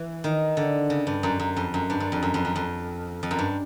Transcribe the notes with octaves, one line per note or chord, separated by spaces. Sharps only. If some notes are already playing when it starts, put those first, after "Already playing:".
Already playing: E3
D#3
D3
C#3
G2
F#2
F#2
F2
F#2
G2
F#2
F2
F#2
F2
F#2
F2
F2
F#2
G2